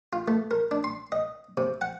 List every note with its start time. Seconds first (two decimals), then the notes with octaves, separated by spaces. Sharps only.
0.13 F4
0.28 A3
0.51 A#4
0.71 D4
0.84 C6
1.12 D#5
1.57 C3
1.81 F#5